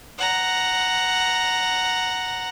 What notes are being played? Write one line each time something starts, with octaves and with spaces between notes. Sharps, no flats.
F#5 A#5